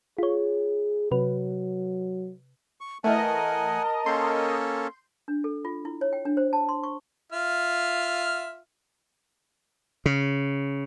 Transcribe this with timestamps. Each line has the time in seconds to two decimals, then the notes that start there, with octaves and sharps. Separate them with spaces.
0.18 F4 G#4 C#5
1.11 C3 F#3 B4
2.81 C#6
3.04 E3 A3 A#4 D#5 F#5 G#5 A5
4.06 A#3 C#4 A4 C6 G6
5.28 D4
5.44 A4
5.65 F4
5.85 E4
6.01 C#5
6.13 G5
6.25 D4
6.37 C5
6.53 A5
6.69 C6
6.83 C#6
7.32 F4 E5 F6
10.06 C#3